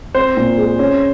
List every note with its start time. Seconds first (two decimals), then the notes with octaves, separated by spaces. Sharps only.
0.15 C4 C5
0.37 A#2
0.58 G#3
0.79 C#4